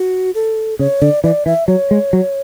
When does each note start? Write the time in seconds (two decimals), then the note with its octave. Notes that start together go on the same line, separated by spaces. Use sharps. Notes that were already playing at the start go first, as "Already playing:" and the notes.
Already playing: F#4
0.35 A4
0.79 C#3 C#5
1.02 D3 D5
1.24 E3 D5
1.46 E3 E5
1.68 F#3 C#5
1.91 G#3
2.13 F#3